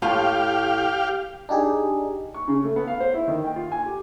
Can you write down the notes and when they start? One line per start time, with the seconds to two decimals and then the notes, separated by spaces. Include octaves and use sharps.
0.02 A2 F4 G4 F5 A5
1.49 D4 D#4 G4 G#4
2.34 C#6
2.48 C#3
2.64 A3
2.76 B3
2.87 F5
3.00 C5
3.14 E4
3.28 D#3
3.44 G5
3.56 F4
3.72 G#5
3.86 G4